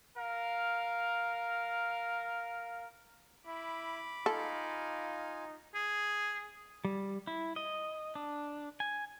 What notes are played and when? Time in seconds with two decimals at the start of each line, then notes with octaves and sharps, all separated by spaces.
0.15 A#4 F5
3.47 E4 B5 D6
4.26 D#4 F4 A4 F5 G#5
5.74 G#4
6.85 G3
7.27 E4
7.56 D#5
8.15 D4
8.80 G#5